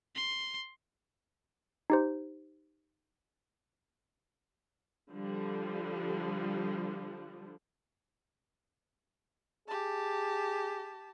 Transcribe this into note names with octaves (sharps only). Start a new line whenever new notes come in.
C6
D#4 G4 C5
D3 F3 G3
G4 G#4 A5